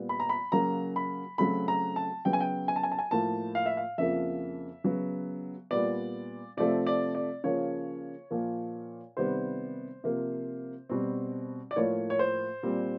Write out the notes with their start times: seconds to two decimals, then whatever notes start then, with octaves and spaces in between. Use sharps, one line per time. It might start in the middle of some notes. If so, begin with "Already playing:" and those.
Already playing: A#2 G3 B3
0.09 B5
0.20 A#5
0.29 B5
0.52 C#3 F#3 A#3 A#5
0.96 B5
1.38 C#3 F#3 A3 C4 B5
1.68 A#5
1.96 A5
2.25 C#3 F#3 B3 G5
2.33 G#5
2.40 G5
2.68 G#5
2.76 A5
2.83 G#5
2.92 A5
2.99 G#5
3.11 A2 F3 A#3 A5
3.55 F5
3.66 E5
3.77 F5
3.98 F2 C#3 F3 A#3 E5
4.84 C#3 F#3 B3
5.71 A#2 G3 B3 D5
6.57 C3 F3 A3 C4 D5
6.87 D5
7.15 D5
7.44 C#3 F3 A#3 C#5
8.31 A#2 F3 A#3
9.17 C3 D#3 G3 B3 C5
10.04 C3 F3 A#3
10.89 B2 G3 C4
11.71 D5
11.76 A2 F3 A#3 C#5
12.10 C#5
12.19 C5
12.63 A#2 G3 C4